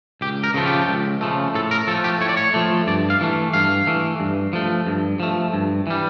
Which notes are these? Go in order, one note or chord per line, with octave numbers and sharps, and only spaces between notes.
C#2 G4
A#4
C#3 F3 A3
G4
C#2
C#3 F3 A3
A2 A4
A#4
F3 A3 A4
G4
A2 C#5
D5
C#5
F3 A3
G2 D5
F5
E3 A3
G2 F5
E3 A3
G2
F3 A3
G2
F3 A3
G2
E3 G3